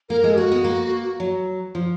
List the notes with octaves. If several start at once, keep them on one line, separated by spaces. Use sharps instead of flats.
A#3 A#4
G#3
A#3 F#4
B3
A#3
F#3
F3